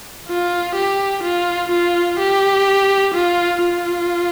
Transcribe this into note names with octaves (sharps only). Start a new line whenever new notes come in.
F4
G4
F4
F4
G4
F4
F4